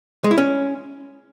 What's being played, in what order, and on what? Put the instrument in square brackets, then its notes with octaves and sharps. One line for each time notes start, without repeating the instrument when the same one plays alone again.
[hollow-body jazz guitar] G#3
E4
C#4